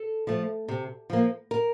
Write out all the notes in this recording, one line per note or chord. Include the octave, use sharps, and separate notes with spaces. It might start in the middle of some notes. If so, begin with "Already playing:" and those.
Already playing: A4
F3 A3
C3
F3 A#3
A#4